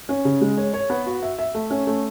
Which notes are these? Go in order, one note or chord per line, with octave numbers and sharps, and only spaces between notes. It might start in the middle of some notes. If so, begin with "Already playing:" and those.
C#4
C#3
G#3
C#5
C#5
B3
F#4
E5
E5
A3
C#4
A3